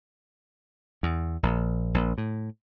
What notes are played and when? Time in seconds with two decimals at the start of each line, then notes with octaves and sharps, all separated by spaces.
1.03 E2
1.43 A#1
1.94 A#1
2.18 A2